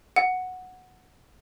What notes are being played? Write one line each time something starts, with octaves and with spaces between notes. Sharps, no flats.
F#5